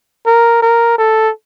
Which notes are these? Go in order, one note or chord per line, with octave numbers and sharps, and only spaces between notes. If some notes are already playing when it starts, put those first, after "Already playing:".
A#4
A#4
A4